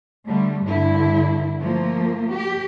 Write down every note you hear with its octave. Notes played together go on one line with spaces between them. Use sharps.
D3 G3 A3
G2 D3 E4
F3 A3 A#3
G4